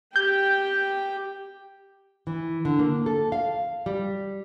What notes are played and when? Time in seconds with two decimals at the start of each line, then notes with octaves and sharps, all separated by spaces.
0.16 G4 G5 G6
2.27 E3
2.65 D3
2.79 A#3
3.06 A4
3.32 F5
3.86 G3